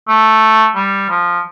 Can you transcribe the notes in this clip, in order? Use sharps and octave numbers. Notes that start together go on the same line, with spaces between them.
A3
G3
F3